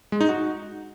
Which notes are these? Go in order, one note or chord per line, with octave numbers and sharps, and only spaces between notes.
G#3
D#4
F#4